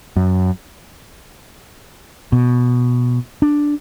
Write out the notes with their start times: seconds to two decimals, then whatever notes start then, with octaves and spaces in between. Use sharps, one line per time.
0.16 F#2
2.32 B2
3.42 D4